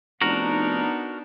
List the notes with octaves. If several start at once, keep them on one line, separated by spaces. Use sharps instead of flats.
F1 B3 D4 D#4 F#4 A#4